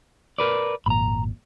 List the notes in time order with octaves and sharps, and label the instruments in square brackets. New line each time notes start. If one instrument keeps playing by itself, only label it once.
[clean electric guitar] A#4 B4 D5
[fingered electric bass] G#1 F2 A#2 [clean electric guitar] A#5 B5